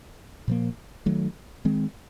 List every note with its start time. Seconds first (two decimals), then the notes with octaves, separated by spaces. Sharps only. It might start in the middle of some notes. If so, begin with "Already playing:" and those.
0.48 A#2 F3 A#3
1.06 D#3 F#3 A3
1.65 D#3 G#3 C4